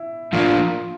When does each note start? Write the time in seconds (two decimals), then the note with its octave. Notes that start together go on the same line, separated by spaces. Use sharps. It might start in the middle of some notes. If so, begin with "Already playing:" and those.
Already playing: E4
0.33 A2 F3 A#3 D4 F4